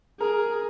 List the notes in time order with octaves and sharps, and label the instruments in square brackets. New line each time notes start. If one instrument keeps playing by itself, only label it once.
[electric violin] G#4 [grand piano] A#4